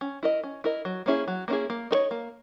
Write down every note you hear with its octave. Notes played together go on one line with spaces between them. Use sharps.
C#4
E4 A#4 D#5
C#4
E4 A#4 D#5
F#3
A#3 C#4 E4 G#4
F#3
A#3 C#4 E4 G#4
A#3
D#4 A#4 C#5
A#3